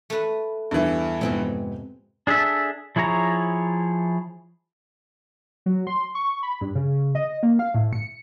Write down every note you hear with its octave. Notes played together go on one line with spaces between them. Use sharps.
A3 B4
E2 G2 E3
F2 G#2 C3 B3 C4 G#4
D4 G#4 A4 E5
F3 E4 G#4 C#5 A#5
F#3
C6
C#6
B5
G2
C#3
D#5
A#3
F5
A2
C#7